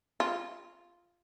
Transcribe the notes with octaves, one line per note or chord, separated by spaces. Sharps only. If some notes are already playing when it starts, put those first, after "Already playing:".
F4